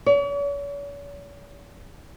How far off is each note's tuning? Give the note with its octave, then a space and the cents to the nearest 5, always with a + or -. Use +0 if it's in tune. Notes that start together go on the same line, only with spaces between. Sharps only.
C#5 +45